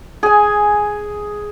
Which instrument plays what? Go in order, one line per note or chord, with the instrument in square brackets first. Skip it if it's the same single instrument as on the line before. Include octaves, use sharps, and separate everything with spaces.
[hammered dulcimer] G#4 G#5